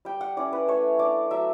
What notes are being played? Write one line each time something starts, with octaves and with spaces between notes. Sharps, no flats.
G3 G5
F#5
C#4 E4 D5
B4
A3 C#5
D4 D5
F#3 E5